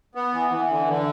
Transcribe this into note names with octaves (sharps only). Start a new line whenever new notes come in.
B3
E3
E3
D3
D3